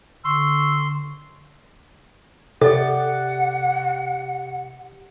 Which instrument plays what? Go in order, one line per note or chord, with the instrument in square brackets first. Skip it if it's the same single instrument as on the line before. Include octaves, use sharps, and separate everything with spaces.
[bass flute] D3 [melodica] C6 [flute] C#6 [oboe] E6
[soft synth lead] C3 [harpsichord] G4 D5 [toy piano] A4 [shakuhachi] F#5